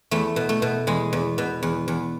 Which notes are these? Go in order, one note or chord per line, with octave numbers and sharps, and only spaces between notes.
E2 A3
B2
A3
B2
E2 G#3
E2
B2
E2
E2